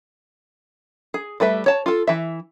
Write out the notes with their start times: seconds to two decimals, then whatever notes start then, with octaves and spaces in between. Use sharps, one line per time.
1.14 G#4
1.40 G3 A3 B4 E5
1.66 C#5 A5
1.86 F4 A4
2.07 E3 E5